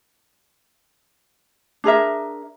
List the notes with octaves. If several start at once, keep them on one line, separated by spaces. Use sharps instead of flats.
D4 G#4 A#4 E5